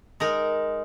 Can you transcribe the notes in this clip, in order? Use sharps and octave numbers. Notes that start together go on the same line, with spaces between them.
G#3 D#4 A#4